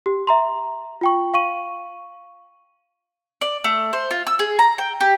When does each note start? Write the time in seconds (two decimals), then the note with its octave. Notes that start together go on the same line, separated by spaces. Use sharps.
0.06 G4
0.27 E5 A#5 C6
1.01 F4 G5 C#6
1.34 F5 C#6 D#7
3.41 D5
3.64 A3
3.93 C5
4.11 F4
4.27 E6
4.39 G#4
4.59 A#5
4.78 G5
5.01 G4